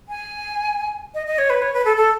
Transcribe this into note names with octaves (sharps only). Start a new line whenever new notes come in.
G#5
D#5
D#5
C#5
B4
C#5
B4
A4
A4